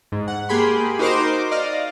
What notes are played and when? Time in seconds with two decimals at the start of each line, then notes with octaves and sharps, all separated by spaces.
0.12 G#2
0.28 F#5
0.49 A#3 G4 G#4 B5 C6
0.99 D#4 F#4 A#4 C5 C6 D6
1.51 D5 D#5 F5